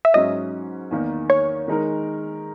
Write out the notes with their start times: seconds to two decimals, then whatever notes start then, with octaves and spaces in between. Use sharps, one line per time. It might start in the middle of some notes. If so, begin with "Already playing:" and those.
0.05 E5
0.14 G#2 F#3 C#4 D#5
0.91 E2 D#3 A#3
1.30 C#5
1.68 D#3 G#3 D#4 A#4